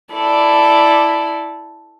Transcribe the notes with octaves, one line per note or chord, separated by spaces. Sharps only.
E4 A4 D5